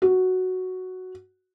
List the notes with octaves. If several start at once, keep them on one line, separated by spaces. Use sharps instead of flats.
F#4